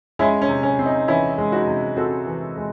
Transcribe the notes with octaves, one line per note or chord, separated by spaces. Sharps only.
G#3 C#4 E4
C#4
C3
C#4
C4
D#4
E3 C#4 E4
G#3
D#4 F#4
C3
C4 F#4 A4
E3
G#3